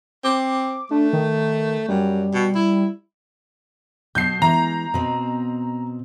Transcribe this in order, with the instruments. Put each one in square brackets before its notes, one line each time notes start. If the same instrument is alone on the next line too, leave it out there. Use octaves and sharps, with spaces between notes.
[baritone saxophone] C4 [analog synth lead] D6
[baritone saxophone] A3 [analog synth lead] D4
[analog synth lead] D#3
[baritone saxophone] F#2 [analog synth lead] G3
[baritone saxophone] B2
E4
[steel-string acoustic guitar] B2 F#3 A5 [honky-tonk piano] G6 C7
[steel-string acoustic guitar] E3 G#3 [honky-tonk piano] A#5
[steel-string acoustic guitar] B2 C4 D#5